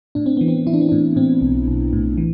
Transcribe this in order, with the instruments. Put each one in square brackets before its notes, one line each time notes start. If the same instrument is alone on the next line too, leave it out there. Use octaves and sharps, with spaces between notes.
[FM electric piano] A2 D4
C4
E3 B3
C4
E3 E4
D4
C4
A2 D4
A2 C4
B1
B1
A2
E3